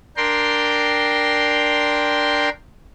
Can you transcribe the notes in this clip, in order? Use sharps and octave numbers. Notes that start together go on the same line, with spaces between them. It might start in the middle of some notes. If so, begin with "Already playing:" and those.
D4 A#4 G5 C6